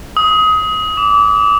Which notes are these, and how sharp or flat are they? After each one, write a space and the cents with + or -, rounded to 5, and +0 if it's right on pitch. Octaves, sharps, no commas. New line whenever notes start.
D#6 +25
D6 -25